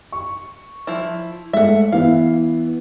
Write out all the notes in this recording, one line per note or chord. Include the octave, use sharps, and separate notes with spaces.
C#6
F3 E4
G#3 A3 E5 F#5
E3 B3 E4 F5